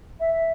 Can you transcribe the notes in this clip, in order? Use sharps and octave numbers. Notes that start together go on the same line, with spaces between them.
E5